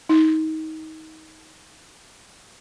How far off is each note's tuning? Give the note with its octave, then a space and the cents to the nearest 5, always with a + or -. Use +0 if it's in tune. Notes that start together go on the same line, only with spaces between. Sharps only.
D#4 +25